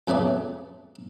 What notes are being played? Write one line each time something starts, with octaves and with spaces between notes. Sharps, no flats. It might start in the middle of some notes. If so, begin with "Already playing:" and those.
F2 C#3 A3 B3 D5